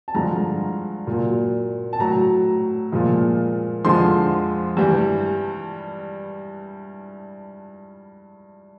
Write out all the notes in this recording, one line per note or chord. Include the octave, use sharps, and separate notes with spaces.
A5
G2 D3 F3 G#3 A#5
A#2 F#3
A5
A2 F#3 A#5
A#2 F3 G#3
F2 D3 F3 G#3 C6
G2 E3 G3